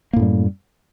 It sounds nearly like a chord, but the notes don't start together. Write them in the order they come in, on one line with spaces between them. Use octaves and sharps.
A#3 A2 F#2 G3